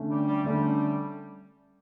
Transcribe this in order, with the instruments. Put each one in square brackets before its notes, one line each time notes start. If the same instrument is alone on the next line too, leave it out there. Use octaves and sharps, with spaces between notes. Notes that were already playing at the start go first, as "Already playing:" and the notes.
Already playing: [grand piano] D3 A3 C#4
[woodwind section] G3
G3
[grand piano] D3 A3 C#4 [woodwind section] G3